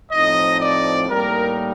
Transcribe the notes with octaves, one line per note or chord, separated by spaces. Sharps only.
A2 F3 C4 D#4 D#5
D5
A2 G3 A#3 D#4 A#4